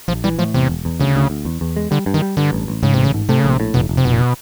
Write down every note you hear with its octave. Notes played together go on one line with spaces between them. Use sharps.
A#1 F3
E3 G3
A2 F3
E2 C3
E1
E2
D2 C#3
D2
D2
E2
E2
G#3
D3 G3
G2
D#3
G3
G2 D3
A1
A1
G#2 C#3
A1 C3
C#3
G#2
C3 A3
A#1 C#3
C3
A2
F1 B2
F1
C3
F1 B2
A#2
B2